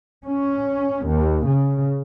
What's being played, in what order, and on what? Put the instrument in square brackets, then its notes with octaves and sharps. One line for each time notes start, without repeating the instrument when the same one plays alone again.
[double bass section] C#4
D#2
C#3